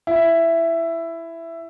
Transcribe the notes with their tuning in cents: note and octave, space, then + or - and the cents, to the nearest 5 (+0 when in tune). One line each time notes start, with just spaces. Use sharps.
E4 +10